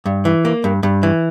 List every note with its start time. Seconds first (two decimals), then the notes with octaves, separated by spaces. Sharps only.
0.06 G2
0.25 E3
0.45 A#3
0.64 G2
0.83 G2
1.03 E3